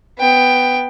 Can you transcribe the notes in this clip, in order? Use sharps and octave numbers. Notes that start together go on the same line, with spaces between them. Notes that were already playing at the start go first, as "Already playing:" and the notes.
B3 G5